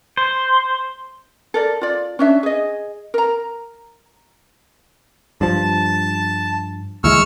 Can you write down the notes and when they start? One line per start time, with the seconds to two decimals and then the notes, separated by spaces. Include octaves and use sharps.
0.17 C5
1.54 A4 A#4 D5
1.81 F4 D5
2.19 C#4 D4 E5
2.43 G#4 D#5
3.14 A#4 A#5
5.41 G2 F3 A5
7.04 D2 E3 G#3 C#6 E6 F6